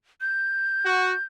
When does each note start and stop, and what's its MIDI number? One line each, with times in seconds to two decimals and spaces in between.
0.21 1.24 91
0.86 1.14 66